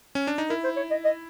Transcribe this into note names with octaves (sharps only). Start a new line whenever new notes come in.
C#4
D4
D#4
E4 A#4
C5
C#5
D#5
D#5